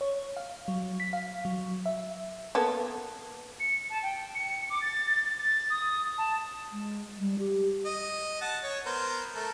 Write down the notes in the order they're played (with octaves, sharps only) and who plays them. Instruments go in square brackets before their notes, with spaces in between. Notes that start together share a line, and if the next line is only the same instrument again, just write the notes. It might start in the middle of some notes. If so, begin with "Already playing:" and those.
[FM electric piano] C#5
F5
F#3
B6
F5
F#3
E5
[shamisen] A#3 B3 A4
[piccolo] C#7
A5
G5
C#7
D6
A6
A6
A6
D#6
A5
[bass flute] G#3
G3
G4
[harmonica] D#5
F#5 A5
C#5
B3 A#4 C5
A3 A4 A#4